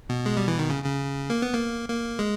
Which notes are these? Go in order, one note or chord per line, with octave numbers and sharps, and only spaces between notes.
B2
G#3
G3
E3
D#3
C#3
C#3
A#3
B3
A#3
A#3
G#3